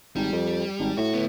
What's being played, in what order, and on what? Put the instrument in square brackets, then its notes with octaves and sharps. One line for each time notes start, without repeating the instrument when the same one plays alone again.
[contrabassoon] G#1 [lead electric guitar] G3
[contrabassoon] F2
G#1
[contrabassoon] A2 [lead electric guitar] F#4
[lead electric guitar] D2 B3